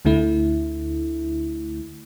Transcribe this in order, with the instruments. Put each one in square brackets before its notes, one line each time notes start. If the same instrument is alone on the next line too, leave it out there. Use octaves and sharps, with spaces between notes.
[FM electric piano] D2 D3 A3 E4